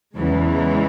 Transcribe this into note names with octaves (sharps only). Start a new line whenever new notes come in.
E2 C#3 E3 G#3